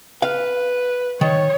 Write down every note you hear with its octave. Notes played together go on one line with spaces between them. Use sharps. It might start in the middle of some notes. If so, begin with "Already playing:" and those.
B4 F5
D#3 C#5